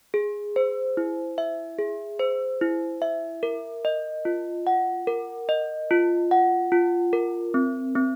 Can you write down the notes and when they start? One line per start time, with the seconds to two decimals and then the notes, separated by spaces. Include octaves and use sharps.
0.14 G#4
0.56 C5
0.97 E4
1.38 E5
1.79 G#4
2.19 C5
2.61 E4
3.02 E5
3.43 A#4
3.85 D#5
4.25 F4
4.67 F#5
5.07 A#4
5.49 D#5
5.91 F4
6.31 F#5
6.72 F4
7.13 A#4
7.54 C4
7.95 C4